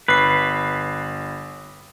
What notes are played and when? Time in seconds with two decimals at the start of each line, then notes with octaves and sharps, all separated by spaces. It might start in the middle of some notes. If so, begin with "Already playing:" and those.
0.08 G1 B4 C7